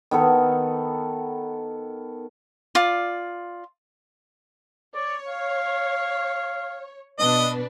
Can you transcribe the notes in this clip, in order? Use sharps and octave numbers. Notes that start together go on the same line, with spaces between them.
D#3 B3 A4
F4 D5
C#5 D5
F5
B2 D4 B4 D#5